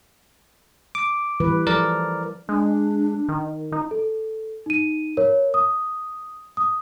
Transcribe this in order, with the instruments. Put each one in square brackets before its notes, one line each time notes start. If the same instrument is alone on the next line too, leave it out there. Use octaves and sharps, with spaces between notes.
[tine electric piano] D6
[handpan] E3 G3 B4
[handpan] F3 A4 [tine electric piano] A#4 D5
[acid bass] G#3 [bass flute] D4
[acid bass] D#3
D#4
[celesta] A4
D#4 D#7
A#4 C#5
D#6
D#6